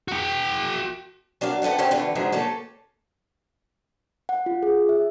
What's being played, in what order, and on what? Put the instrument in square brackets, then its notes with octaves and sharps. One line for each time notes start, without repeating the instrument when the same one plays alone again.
[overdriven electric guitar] F#4 G5
[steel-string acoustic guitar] F#3 D4 A#4 F5
C3 A4 B4 D5 F#5
D3 C4 C#4 C5 F5
D3 E3 B3 F4 A4
E2 G#2 D3 F3 F#3
A3 A#3 C#4 A4
[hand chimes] F#5
F4
G#4
E5